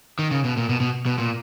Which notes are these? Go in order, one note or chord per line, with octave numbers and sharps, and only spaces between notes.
D#3
C#3
B2
A#2
B2
B2
B2
A#2